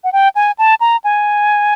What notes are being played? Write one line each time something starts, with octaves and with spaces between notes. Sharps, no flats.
F#5
G5
G#5
A5
A#5
G#5